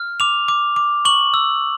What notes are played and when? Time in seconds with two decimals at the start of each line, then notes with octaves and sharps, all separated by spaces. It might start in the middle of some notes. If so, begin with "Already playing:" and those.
Already playing: F6
0.20 D6 F7
0.48 D6
0.76 D6
1.05 C#6 F#7
1.34 E6